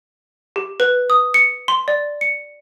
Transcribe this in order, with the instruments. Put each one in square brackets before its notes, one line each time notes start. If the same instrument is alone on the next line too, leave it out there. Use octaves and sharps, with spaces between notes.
[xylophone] G4
B4
D#6
C#7
C6
D5
C#7